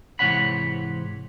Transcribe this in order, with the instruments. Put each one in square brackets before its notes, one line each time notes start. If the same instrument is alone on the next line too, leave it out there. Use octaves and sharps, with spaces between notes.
[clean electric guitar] G#2 C3 E3 C#5 F#5 B5